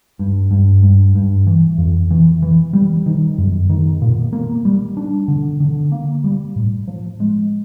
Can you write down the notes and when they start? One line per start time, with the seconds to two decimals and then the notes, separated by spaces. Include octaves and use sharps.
0.19 G2
0.51 G2
0.83 G2
1.15 G2
1.47 E3
1.78 F2
2.11 E3
2.42 E3
2.73 G3
3.06 D#3
3.38 F#2
3.70 D#3
4.02 A#2
4.33 A#3
4.65 G3
4.97 D4
5.28 D3
5.60 D3
5.92 A#3
6.24 G3
6.56 A2
6.88 F3
7.20 G#3